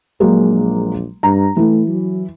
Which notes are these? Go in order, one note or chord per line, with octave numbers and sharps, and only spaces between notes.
A#1 F#3 G#3 A#3
G2 A#5
E3 A3
F#3